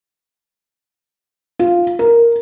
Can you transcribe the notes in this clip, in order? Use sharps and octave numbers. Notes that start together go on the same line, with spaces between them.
F4
A#4